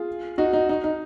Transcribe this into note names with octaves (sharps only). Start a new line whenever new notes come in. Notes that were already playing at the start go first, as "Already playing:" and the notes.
Already playing: F4 G#4
D#4 F#4
D#4
D#4
D#4